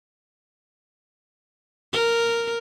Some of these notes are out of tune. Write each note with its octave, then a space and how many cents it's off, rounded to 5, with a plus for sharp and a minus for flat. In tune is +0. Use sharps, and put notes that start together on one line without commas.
A#4 -5